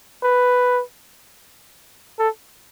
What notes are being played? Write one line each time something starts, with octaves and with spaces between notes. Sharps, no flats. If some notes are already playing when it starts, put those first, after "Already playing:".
B4
A4